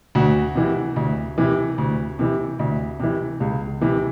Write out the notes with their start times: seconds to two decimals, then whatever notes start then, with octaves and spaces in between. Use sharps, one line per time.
0.15 D2 F#4
0.55 C3 E3
0.96 D2
1.38 C3 E3
1.78 D2
2.19 C3 E3
2.59 D2
3.00 C3 E3
3.40 C#2
3.81 C3 E3